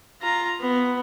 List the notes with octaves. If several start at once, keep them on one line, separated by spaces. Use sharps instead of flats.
F4 A#5
B3